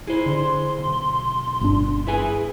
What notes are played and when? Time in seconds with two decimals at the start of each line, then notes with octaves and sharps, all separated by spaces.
0.07 E4 G#4 C5
0.26 D3 C6
0.78 B1
1.61 G1 D4
2.07 E4 G#4 B4 G#5